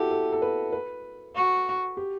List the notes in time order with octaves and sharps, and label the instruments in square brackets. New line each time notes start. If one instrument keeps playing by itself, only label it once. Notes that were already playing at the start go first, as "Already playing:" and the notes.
Already playing: [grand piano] E4 F#4 A4 [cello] G4
[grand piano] A4
A4
B4
B4
[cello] F#4
[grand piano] G4